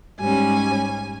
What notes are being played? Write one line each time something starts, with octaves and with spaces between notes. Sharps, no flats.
G#2 G3 C#4 G#5